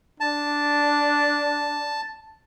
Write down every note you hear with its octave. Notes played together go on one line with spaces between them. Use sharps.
D4 A5